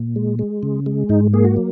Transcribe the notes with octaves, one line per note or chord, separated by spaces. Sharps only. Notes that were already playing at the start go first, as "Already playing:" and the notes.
Already playing: A#2
G#3
G#3
C#3
G#3
G#2 D#4
A#3 G#4
F#4
F#3